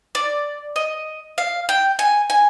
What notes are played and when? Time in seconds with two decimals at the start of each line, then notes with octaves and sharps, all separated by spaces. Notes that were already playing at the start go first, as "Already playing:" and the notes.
0.15 D5
0.76 D#5
1.38 F5
1.69 G5
1.99 G#5
2.30 G#5